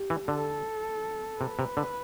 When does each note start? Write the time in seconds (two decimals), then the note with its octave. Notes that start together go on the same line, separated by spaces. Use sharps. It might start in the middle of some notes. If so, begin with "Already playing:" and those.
Already playing: G4
0.10 E3
0.28 D3 A4
1.40 C3 B4
1.59 C3
1.77 D3